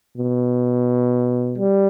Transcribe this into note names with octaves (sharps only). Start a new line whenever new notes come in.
B2
G3